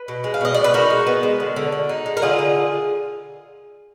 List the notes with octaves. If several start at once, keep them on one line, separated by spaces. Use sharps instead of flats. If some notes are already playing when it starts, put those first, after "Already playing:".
Already playing: B4
B2
G#3
F5
B2 D#5
B2 D5
B4
D#4 F#4 A#4
G#3
B3
G#3
D3
D3
D3
D#4
G#3
A#4
D3 F4 G#4
D3